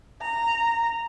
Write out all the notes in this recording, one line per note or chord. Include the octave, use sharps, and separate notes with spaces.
A#5